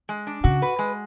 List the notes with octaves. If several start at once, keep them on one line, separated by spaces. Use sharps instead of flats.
G#3
D4
C#3 F#4
B4
G#3